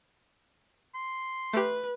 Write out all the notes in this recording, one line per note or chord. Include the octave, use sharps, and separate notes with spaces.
C6
A3 G4 B4